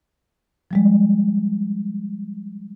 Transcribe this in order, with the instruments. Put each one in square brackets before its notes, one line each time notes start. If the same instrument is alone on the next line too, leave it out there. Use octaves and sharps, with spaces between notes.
[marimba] F3 G3 G#3